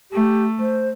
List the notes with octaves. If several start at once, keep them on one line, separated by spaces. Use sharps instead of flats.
A3 G4
C5